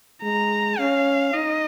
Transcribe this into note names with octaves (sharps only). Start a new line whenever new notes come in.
G#3 A#5
C#4 F5
D#4 D#5